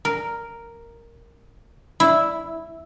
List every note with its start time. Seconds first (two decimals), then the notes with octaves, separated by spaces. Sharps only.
0.05 A#4
2.00 E4